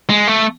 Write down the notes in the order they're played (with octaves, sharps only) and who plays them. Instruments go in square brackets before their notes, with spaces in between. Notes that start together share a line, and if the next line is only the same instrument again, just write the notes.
[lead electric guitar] G#3
A3